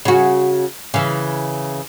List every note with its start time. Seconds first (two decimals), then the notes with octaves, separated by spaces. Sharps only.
0.05 C#3 F#4
0.94 C#3 E3